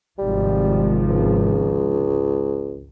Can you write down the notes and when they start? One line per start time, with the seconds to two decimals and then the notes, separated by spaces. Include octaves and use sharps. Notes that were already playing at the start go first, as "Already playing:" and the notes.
0.19 G#1 C3 F3 G3
1.08 C#2